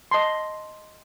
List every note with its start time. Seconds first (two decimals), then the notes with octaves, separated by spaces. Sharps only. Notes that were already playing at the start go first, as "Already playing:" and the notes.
0.11 D#5 A5 C6